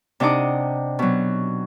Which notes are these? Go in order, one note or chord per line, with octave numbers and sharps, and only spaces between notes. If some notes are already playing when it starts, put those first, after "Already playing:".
C3 D4 D#4 F#5 D6 D#6
B2 F#3